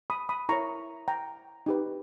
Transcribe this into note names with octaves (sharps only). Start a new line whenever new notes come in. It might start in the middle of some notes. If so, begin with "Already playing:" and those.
B5 D#6
B5 D#6
E4 A#4 C#5 A#5 C#6
G5 A#5
D#4 G4 B4